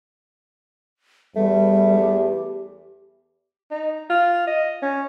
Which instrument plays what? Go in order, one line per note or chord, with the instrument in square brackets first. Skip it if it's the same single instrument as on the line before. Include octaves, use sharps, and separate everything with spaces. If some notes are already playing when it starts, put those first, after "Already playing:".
[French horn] E2 [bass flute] G3 [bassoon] A3
[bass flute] G4
[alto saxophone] D#4
F4
D#5
C#4